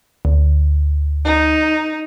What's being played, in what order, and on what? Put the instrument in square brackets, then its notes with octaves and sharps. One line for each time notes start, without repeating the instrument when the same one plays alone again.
[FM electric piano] D2
[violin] D#4